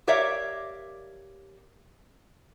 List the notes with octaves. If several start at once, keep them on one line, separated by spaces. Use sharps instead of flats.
G4 A#4 C#5 D5 E5 F5